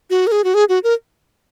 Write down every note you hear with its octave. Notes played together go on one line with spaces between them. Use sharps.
F#4
A#4
G#4
F#4
G#4
F#4
A#4